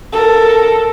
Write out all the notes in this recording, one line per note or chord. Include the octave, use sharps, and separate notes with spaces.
A4 A#4